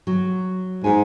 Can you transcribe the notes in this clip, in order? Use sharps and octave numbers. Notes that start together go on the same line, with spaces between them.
F#3
G#2 G#5